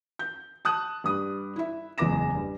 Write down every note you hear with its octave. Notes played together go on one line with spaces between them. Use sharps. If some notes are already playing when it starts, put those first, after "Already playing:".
G6
A5 D#6 F#6
G2 D#6
E4 E5
F#1 E2 G#3 D6 A#6 E7
G2